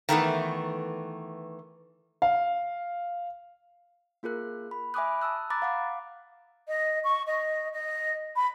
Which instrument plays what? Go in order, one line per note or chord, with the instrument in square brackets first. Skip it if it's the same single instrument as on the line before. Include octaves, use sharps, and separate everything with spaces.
[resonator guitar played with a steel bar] D#3 E3 A3 B3
[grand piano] F5
[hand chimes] A#3 F4 G#4 A#4 F#6
B5
E5 G#5 B5 D6 D#6 F#6
A5 D#6 E6 F#6
A#5 B5 D6 F#6 A6
F5 F#5 D6
[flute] D#5
C#6
D#5
D#5
B5